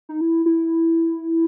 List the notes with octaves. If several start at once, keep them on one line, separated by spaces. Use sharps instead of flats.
D#4
E4
E4